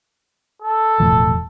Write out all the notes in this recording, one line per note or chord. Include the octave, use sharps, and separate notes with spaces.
A4
E1 A2 F3